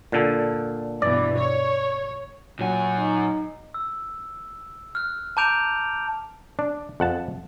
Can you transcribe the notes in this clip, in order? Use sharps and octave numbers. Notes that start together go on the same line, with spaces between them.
A#2 D3 A4
G2 B2 E3 D5
C#5
F#2 A#2 F#3 F#5 G#5
D#4
E6
F6 F#6
A5 A#5 D6 G6 D7 F7
D4
F2 F#5 A5